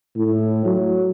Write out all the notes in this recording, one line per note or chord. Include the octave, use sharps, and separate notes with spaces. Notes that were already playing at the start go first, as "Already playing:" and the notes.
A2
F#3